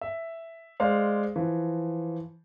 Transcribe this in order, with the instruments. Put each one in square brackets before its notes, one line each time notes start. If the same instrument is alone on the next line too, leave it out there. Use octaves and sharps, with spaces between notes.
[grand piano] E5
G#3 C5 D5 F5
E3 F3